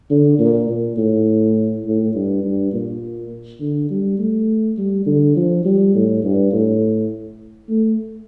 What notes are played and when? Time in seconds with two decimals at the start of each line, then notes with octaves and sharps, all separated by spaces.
0.10 D3
0.39 A#2
0.69 A#2
0.97 A2
1.85 A2
2.14 G2
2.44 G2
2.73 A#2
3.60 D3
3.91 G3
4.19 A3
4.78 G3
5.06 D3
5.36 F3
5.65 G3
5.95 A2
6.24 G2
6.53 A2
7.69 A3